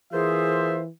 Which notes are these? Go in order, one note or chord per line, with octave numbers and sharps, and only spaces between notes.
E3 A#3 F4 G#4 C5 E5